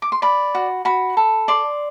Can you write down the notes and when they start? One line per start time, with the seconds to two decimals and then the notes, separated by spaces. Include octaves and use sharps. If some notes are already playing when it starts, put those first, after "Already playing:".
0.02 D6
0.12 C6
0.22 D5 B5
0.55 F#4
0.85 F#4 B5
1.17 A4
1.48 D5 C6